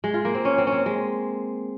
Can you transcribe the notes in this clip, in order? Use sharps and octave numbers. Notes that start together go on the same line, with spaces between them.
G#3
F4
A#3
C4
C#4
C4
C#4
C4
G#3